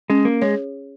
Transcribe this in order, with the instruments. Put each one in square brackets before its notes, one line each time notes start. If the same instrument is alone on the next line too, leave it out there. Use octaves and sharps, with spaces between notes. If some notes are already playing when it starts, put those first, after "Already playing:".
[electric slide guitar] G#3 [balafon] C#4
[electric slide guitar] A#3
[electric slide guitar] G#3 [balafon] G#4 C#5